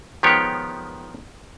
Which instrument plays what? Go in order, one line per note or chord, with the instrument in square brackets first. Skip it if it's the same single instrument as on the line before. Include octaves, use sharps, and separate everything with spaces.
[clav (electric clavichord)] D#3 F3 G#3 B3 G4 C#5